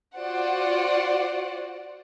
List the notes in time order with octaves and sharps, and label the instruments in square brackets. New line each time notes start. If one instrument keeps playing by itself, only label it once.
[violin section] F4 F#4 C5 D5 F#5